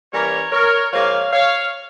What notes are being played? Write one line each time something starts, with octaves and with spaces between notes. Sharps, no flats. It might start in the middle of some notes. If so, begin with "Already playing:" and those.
E3 G3 A#3 C#4 A#4 C#5
A#4 C#5
G#2 F3 A#3 C#5 F5
C#5 F5